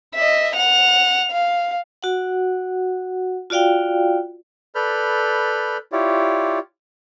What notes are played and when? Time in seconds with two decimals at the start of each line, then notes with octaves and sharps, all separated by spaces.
0.14 D#5 E5
0.57 F#5 F7
1.31 F5
2.03 F#4 F#5
3.50 F4 F#4 D5 F5 G5
4.75 A4 B4 D5 B5 F6 G6
5.92 E4 F4 G4 C#5 D5